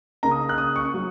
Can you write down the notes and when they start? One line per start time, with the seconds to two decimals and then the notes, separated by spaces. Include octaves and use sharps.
0.23 C#3 A#3 D#4 A#5
0.31 D#6
0.49 F#6
0.58 D#6
0.76 C#6
0.94 F#3 C#4